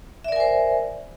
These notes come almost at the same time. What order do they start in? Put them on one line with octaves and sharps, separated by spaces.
E5 D5 A#4 G#5 C5